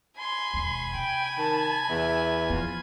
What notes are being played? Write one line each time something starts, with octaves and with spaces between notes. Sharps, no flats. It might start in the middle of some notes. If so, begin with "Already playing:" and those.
G#5 B5 C6
E1 D#2
C3 G5
D#3 A5
E2 E5
F3 B3 F4